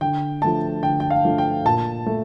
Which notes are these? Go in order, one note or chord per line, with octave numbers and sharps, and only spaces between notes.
D3 G5
F3 A3 D4 A5
D3 G5
G5
F5
F3 A3 D4
G5
A#2 A5
A3